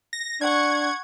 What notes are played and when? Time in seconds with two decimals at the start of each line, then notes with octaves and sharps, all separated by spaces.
0.13 A#6
0.41 D4 F#5 C#6 G#6